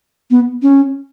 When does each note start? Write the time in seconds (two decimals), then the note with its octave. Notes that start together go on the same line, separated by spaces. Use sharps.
0.31 B3
0.62 C#4